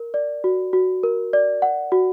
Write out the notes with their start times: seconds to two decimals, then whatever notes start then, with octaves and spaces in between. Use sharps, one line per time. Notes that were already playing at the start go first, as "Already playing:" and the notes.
Already playing: A#4
0.14 D5
0.44 F#4
0.73 F#4
1.03 A#4
1.33 D5
1.62 F#5
1.92 F#4